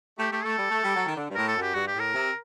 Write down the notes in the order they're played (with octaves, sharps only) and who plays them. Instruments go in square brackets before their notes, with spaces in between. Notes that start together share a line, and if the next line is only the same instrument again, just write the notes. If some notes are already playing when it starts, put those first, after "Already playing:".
[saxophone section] A3 [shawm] G4
[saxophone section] A3 [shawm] G4
[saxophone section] A3 [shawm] A4
[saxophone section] G3
A3
G3
F#3
D#3
D3
G2
[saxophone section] A2 [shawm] A#4
[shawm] A4
[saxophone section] F#2
[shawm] G4
[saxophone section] G2 [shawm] F#4
[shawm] G4
[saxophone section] A2
[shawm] A#4
[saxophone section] C3